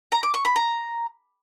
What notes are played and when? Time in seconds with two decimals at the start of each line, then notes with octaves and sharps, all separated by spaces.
0.12 A#5
0.23 D6
0.34 C#6
0.45 B5
0.56 A#5